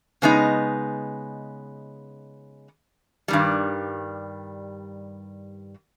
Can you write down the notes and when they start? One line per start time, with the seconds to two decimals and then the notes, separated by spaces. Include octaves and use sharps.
0.22 C#3 G#3 B3 D#4
3.28 G2 D#3 G3